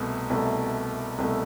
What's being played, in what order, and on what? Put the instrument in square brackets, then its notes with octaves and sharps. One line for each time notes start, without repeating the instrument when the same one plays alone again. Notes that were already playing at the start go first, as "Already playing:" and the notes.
Already playing: [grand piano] C2 B2 A3
C2 B2 A3
C2 B2 A3